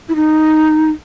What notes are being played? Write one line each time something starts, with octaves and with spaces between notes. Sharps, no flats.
E4
D#4